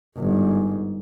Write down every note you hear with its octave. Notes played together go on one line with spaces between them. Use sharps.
G1 G#2